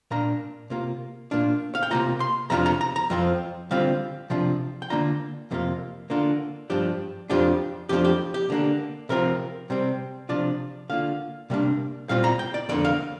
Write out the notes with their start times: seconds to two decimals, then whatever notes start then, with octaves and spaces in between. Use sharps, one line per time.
0.11 A#2 A#3 D4 A#5
0.70 C3 A#3 F4
1.31 A#2 A#3 D4 F4
1.75 F5
1.83 G5
1.91 C3 A#3 F4 A#5
2.20 C6
2.50 F2 C3 F3 D4 F4 A#5
2.66 A#5
2.81 A#5
2.96 A#5
3.10 F2 F3 C4 F4
3.71 D3 G3 C4 F4 F5
4.30 C3 F3 D4 F4
4.82 G5
4.90 D3 A#3 D4 F4 A#5
5.51 F2 C3 A#3 F4
6.10 D3 A#3 D4 F4
6.70 G2 F3 D4 G4
7.30 F2 F3 D4 F4 G4
7.89 F2 F3 D4 G4
8.05 G4
8.34 G4
8.50 D3 A#3 D4
9.09 C3 F3 C4 F4 A#4
9.70 C3 G3 C4
10.29 C3 F3 D4 F4 D5
10.90 D3 A#3 F4 F5
11.50 C3 G3 A#3 D4
12.09 A#2 G3 C4 F4 F5
12.24 A#5
12.39 G5
12.54 D5
12.69 F2 D3 A#3 D5
12.85 F5